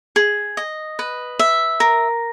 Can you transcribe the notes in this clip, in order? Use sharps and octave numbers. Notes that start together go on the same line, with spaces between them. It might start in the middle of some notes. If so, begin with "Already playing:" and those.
G#4
D#5
B4
E5
A#4